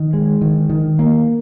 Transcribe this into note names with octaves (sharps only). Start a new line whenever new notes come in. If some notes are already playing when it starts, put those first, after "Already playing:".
Already playing: D#3
G#3
D#3
D#3
A#3